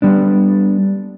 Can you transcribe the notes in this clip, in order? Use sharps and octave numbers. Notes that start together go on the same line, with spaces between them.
G3 B3 D4